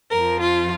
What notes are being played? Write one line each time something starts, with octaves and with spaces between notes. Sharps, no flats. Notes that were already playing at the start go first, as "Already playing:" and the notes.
F2 F3 A#4
F4